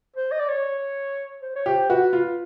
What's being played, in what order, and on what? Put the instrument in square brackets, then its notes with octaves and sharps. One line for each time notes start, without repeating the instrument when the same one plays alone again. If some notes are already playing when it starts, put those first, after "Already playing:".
[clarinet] C5
D#5
D5
C#5
C5
C#5
[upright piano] G4 [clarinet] C5
[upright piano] F#4 [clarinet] B4
[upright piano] F4